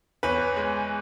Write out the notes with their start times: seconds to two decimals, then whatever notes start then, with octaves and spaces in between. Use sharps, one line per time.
0.23 E2 B4 C#5
0.56 G#3